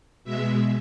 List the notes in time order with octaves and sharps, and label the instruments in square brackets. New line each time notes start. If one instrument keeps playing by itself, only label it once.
[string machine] B2 G#3 E5